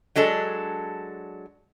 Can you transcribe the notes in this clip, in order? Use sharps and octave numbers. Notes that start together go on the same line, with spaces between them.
F#3 G#3 D4 A4